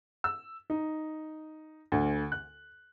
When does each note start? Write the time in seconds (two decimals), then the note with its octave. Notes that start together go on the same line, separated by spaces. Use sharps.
0.24 E6
0.70 D#4
1.92 D2
2.32 F#6